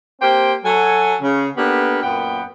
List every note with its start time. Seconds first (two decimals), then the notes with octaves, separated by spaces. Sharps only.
0.22 A#3 C4 G4 C5 G5
0.64 F#3 A4 G#5
1.21 C#3
1.57 A#3 B3 D4 G4 A4 B4
2.03 F#2 A#2 B3 F#5 G5